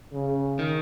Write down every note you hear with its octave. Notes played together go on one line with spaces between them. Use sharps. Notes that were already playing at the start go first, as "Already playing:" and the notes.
C#3
D#3